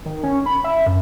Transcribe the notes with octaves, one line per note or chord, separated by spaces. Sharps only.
D#3
C#4
B5
E5
F#2